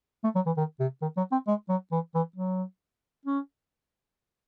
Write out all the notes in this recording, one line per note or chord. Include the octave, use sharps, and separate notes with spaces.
A3
F#3
E3
D#3
C3
D#3
F#3
C4
G#3
F#3
E3
E3
F#3
C#4